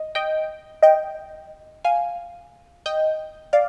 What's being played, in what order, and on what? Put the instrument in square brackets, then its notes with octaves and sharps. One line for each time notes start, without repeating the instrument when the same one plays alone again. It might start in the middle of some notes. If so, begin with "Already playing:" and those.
Already playing: [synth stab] D#5
D#5 G5
D#5 G5
F5 G#5
D#5 G5
D5 F5